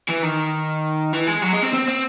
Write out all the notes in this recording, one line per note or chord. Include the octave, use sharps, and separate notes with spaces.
E3
D#3
E3
G#3
F#3
G#3
C4
C4
C4